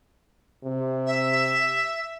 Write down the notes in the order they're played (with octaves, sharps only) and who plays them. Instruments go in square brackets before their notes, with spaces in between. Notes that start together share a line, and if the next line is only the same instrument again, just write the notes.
[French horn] C3
[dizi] E5